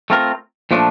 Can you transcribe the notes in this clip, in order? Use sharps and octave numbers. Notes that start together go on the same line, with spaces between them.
A3 C4 F4 A#4
A#2 F3 A3 D4